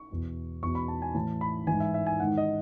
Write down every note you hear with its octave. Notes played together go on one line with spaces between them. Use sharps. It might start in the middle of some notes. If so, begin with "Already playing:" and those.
Already playing: C#6
E2 B2
E2 B2 C#6
B5
A5
G#5
A2 E3 A5
B5
G#2 E3 G#5
E5
E5
G#5
G#2 D#3 F#5
D#5